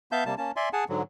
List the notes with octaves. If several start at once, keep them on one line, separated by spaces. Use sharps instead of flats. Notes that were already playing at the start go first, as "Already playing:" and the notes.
B3 E5 F5 A5 G6
C3 G3 A#3 A5
A#3 C#4 A5
D5 E5 G#5 C6
G#4 F#5 G#5 A5
G#2 D3 F#3